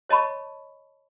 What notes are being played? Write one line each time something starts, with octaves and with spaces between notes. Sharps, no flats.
C#5 D#5 A5 B5 C#6